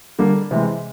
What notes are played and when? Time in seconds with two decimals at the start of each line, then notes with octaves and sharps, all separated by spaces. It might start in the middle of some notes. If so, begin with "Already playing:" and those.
0.19 D3 G3 A#3
0.51 C3 E3 G#3